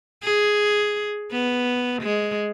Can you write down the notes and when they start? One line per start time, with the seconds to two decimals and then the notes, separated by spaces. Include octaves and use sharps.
0.23 G#4
1.32 B3
2.02 G#3